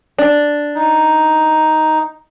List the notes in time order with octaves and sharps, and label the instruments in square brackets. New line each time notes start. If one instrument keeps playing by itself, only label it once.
[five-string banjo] D4
[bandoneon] D#4